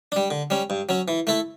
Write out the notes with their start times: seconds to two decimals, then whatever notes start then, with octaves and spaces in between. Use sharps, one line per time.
0.12 G3 D4
0.31 D3
0.50 G3 C#4
0.70 G2
0.89 F#3 C#4
1.08 E3
1.27 A3 E4 A4